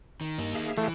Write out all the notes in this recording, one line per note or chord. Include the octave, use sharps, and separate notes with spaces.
D#3
G2 A#3 D#4
G#4 E5 F5
E3 A3